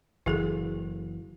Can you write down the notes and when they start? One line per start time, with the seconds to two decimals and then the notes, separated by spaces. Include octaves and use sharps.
0.26 F#1 E3 E4 G#4 A4